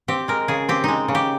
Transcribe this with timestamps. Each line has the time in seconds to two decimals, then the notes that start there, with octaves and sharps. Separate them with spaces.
0.08 C4 G4
0.28 G#3 A#4
0.48 C#3 G#4
0.69 C4 G4
0.84 G#3 D#4
1.08 C#3
1.15 G4